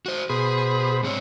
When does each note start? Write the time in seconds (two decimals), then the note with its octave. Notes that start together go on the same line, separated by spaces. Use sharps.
0.06 F#4 C5
0.30 B2 G#4 C5 B5
1.03 G#2 C4 C#5